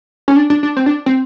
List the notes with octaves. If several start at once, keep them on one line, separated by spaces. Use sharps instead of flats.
C#4
D4
D4
D4
C4
D4
C4